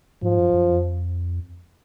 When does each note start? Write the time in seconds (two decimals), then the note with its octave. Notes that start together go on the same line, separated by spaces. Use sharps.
0.22 G#2 F3
0.38 F#2
0.54 F#2
0.70 F2